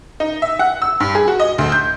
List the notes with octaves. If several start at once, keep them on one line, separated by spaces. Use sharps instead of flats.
D#4
E5
F#5
E6
G2
G#4
F#4
D#5
D2
G6